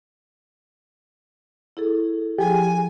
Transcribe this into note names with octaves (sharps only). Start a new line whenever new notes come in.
E4 G#4 A4
F3 G4 G#4 G#5